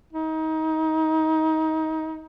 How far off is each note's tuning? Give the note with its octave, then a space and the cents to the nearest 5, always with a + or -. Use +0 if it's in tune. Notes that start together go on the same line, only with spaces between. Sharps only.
D#4 +25